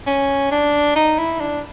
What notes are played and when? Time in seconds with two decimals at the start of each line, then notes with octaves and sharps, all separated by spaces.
0.07 C#4
0.52 D4
0.96 D#4
1.18 E4
1.41 D4